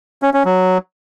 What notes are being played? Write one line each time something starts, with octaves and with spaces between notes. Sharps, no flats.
C#4
C#4
F#3